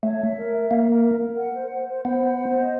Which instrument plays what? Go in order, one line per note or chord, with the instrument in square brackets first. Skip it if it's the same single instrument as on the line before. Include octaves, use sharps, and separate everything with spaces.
[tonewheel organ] A3 [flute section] C#5
[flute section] E5
A#4
E5
[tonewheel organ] A#3 [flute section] A#4
[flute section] A#4
A#4
A#4
F#5
C5
C5
C5
[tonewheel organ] B3 [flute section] C5
[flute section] F#5
C5
D#5